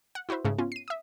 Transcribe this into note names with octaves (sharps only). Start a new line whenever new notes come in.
F#5
E4 F#4 B4 C5 E5
G#2 C#3 A3
B3 C#4 F4
C7 D#7
E5 D#6